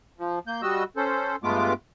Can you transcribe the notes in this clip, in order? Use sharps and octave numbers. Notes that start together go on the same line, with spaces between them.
F3
A#3 G6
G3 F#4 D#5 E6
C#4 A4 C5
G2 G#3 A3 B3 F4 D6